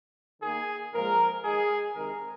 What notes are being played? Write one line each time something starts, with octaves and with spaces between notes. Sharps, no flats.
D#3 A#3 G#4
A#2 F3 G#3 A#4
D#3 G#3 G#4
C3 D#3 G#3 A#4